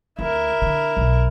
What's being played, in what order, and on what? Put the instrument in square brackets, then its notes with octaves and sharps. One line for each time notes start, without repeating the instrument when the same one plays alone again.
[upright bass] D2 [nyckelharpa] E4 A#4
[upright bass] D3
B1